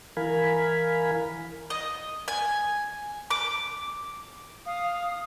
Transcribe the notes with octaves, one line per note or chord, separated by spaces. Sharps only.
E3 A#4 F5 G#5 B5
D#5
G#5
D6
F5 D#6